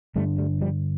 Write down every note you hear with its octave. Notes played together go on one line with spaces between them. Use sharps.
G2 D3 G3 A3
G3 A3
F3 G3